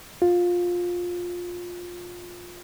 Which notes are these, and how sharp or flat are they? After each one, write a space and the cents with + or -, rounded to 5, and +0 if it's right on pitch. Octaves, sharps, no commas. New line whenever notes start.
F4 +15